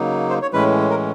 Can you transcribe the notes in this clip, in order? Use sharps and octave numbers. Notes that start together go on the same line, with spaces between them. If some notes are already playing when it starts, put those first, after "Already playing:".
Already playing: C#3 F#3 A#3 D#4
C5
C#5
A2 E3 G#3 C#4 B4
A#4